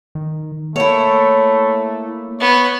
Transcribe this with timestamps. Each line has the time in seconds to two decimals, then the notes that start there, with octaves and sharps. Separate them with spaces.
0.15 D#3
0.76 A3 A#3 E4 C#5
2.40 B3 C#5